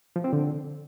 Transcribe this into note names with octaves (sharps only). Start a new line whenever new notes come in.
F3
C4
D3